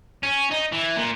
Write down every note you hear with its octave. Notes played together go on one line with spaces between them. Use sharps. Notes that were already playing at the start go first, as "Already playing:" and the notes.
C#4
D#4
E3
A#2